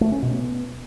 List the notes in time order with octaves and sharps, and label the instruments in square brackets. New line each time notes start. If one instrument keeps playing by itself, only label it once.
[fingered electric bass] A3
C#4
B2
B3